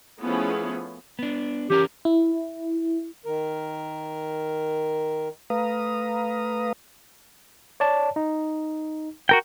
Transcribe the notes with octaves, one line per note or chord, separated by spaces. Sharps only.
F3 A3 B3 C#4 E4 G#4
B3 D4
E3 C#4 G4 A#4
E4
D#3 A#4
A3 B4 F5 A#5 D#6
C#5 D5 A5
D#4
F#4 A#4 G5